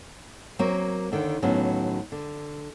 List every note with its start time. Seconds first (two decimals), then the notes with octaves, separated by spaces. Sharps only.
0.59 F#3 A#3 C4 C#5
1.12 D#2 D3 D#3
1.42 D#2 A2 F#3 B3 C#4
2.12 D3